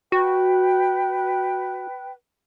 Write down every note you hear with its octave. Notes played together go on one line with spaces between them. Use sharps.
F#4 B4 G5